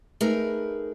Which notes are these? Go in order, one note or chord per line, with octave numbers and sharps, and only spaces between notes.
A3 D#4 G#4 A#4 B4